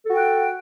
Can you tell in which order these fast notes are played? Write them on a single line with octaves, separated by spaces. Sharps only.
A4 F#4 G5 F#5